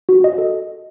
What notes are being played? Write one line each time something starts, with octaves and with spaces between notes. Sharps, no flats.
F#4
D#5
A4